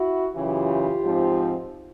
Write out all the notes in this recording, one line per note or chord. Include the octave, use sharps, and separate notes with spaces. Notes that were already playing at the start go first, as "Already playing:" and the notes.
Already playing: E4 F#4
F#2 C#3 E3 F4 G4
G#2 F3 G#3 C4